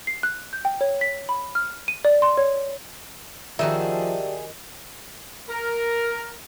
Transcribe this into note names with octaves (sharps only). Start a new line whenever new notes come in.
C7
F#6
G6
G5
C#5
B6
B5
F6
D#7
D5
C6
C#5
D#3 F3 G3 D4 F#4 G#4 E5
A#4